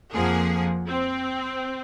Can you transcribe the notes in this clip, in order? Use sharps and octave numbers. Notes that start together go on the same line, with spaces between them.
F2 F3 A#3 G#4 F#5
C4